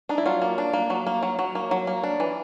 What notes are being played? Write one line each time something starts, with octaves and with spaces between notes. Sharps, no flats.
D4 D#4
E4
F#3 F4
A#3
D4
A#3
F#3
A#3
F#3
F#3
A#3
F#3
A#3
D4
E3